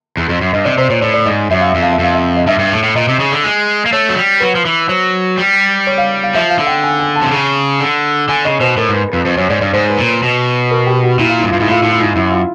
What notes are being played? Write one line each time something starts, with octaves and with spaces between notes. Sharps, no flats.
E2
F2
F#2
G2 D#5
C3 D5
C3 C5
A#2 C#5
A2 D5
D5
G#2 D#5
F#2 E5
F5
F2 E5
F5
E5
F2 F5
E5
D#5
G2 E5
G2
A2
A2
A#2 D#5
C3
C#3
D3
G#3
A#3
A3 C#5
F#3
G3
F#3 B4
F3
E3
F#3 C5
G3
C#5
F5
F5
F3 E5
F5
D3
G5
G#5
G#5
A5
C3
C#3
D3
D3 G#5
C#3 D#5
B2 C5
A2 A#4
G#2 B4
F2 B4
F2 C5
F#2 C#5
G#2 D5
G2 D5
G#2 C5
B4
A#2
B4
B2
A#4
G4
F#4
A#2 E4
F4
G2 E4
G2 F4
G#2 E4
A2 F4
A2 E4
F4
G#2 E4
F#2 E4
F4